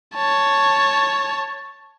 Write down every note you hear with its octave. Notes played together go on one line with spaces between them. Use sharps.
C#5 A5